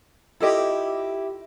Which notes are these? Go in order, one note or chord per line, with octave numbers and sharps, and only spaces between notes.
E4 F4 G4 A4 D#5